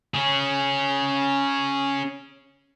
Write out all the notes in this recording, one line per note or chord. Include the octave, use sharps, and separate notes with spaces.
C#4 G#4